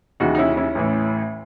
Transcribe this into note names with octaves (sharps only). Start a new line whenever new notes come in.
D#2 C#3 E3 D#4 F#4
D#4
C#4 E4
C#4 E4
A1 A2 E3